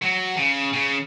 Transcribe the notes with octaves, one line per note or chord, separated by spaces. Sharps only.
F#3
C#3
C#3